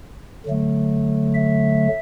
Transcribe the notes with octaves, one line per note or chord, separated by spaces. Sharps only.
D3 F#3 A3
E5